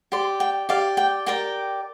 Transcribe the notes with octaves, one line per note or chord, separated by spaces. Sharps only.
G4 D5 C6
G5
G4 D5 F5
G5
G4 A#4 D5 G5